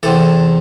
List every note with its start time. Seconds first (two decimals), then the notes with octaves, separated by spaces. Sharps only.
0.03 E2 C3 E3 A4